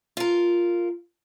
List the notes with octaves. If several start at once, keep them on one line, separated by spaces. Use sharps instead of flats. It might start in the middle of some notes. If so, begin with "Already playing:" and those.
F4 A#4